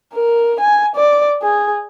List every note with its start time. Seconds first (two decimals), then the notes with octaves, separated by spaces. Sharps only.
0.14 A#4
0.61 G#5
0.96 D5
1.42 G#4